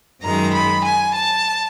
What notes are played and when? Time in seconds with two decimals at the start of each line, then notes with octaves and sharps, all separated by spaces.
0.23 F#2 D#3 G#3 A#5
0.54 B5
0.85 G#5
1.16 A5